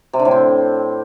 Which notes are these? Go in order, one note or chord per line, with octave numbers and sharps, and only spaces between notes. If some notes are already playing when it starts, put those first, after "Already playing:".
C3
D3
A2
C4